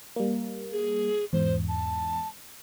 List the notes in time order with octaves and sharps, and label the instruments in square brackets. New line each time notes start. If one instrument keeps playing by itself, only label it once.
[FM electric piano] G3 A#3
[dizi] G#4
[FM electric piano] E2 G#2 [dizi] C5
[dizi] A5